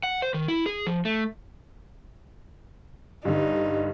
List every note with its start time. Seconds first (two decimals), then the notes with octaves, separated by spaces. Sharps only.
0.03 F#5
0.22 C5
0.34 D#3
0.48 E4
0.66 G#4
0.87 F3
1.05 A3
3.25 G2 D3 D#4